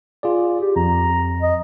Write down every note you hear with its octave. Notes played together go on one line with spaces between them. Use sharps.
F4 G#4 D5
G4
F2 A#5
D#5